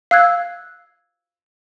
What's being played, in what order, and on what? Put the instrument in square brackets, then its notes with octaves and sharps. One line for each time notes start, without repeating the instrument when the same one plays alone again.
[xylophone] F5 E6 F#6 G#6